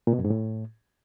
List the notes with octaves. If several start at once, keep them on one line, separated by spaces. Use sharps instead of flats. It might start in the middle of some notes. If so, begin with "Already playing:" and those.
A#2
B2
F#2
G#2
A2